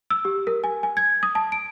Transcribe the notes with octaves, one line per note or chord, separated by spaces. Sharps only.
E6
G4
A#4
G#5
G#5
G#6
D#6
A5
D7